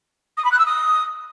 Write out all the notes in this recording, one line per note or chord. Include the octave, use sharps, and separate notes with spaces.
D#6
B5
F#6
E6
D#6